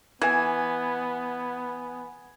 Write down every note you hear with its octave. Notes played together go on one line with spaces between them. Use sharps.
E3 B3 G#5